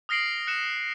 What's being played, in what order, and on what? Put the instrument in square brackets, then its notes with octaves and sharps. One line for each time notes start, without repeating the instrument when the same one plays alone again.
[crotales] D#6 F6 A#6 C7 D7 F#7
F#6 C#7 E7